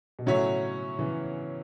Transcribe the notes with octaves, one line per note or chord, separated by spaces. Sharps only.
B2
A2 C#3 F#3 C#4 F#4 C#5 E5
C#3 E3